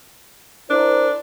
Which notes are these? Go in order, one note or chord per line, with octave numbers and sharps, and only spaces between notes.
D4 E4 A#4 C5